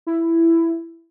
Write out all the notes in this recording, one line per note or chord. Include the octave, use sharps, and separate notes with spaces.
E4